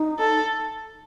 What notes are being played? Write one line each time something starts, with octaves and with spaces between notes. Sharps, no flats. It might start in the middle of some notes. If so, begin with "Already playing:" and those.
Already playing: D#4
A4